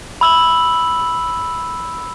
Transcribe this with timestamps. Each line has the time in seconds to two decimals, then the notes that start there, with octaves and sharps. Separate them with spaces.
0.21 B5 E6 F#7